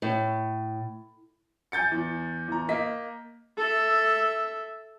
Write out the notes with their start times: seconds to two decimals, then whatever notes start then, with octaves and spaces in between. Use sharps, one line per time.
0.02 A2
1.72 G#5 G6 A6 C#7
1.91 E2
2.48 E2 A#5
2.69 A#3 D#5 B6
3.58 A4 E5